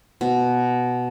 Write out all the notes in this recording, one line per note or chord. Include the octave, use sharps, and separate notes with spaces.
B2